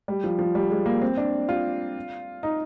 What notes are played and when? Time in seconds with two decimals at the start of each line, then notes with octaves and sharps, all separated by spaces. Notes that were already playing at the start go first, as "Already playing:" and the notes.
0.08 G3
0.24 F3
0.39 F3
0.55 G3
0.70 G#3
0.86 A#3
1.01 C4
1.17 D4
1.49 F4
2.43 D#4